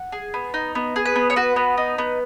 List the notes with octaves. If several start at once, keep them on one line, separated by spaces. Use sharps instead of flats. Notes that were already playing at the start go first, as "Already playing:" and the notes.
Already playing: F#5
G#4
B3
D#4
B3
G#4
B4
B3
C#5
F#4 B4
B3
D#4
B3